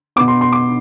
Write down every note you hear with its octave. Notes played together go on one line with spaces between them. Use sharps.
B2 B3 D6
C6
C6
D6